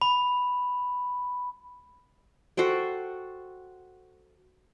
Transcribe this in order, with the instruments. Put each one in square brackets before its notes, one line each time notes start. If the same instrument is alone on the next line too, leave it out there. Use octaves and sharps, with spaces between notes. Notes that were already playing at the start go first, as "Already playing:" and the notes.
[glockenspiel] B5
[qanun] F#4 A4 C5 G5